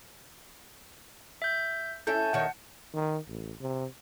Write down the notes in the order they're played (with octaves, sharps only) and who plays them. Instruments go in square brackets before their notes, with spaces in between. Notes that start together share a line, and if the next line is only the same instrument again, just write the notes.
[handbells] E5 G6
[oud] C#4 E4 A4 [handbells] A5 G6
[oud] D#2 D#3 C#5 [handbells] F#5
[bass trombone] D#3
A1
C3